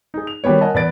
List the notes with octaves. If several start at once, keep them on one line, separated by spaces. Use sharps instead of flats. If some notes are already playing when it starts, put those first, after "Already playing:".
D#4 G#4
F7
D#3 F#3 G3 A#3 B3 C#5
A#4 D#5 F#5 G#5 A5
E2 B4 D5 A6 D7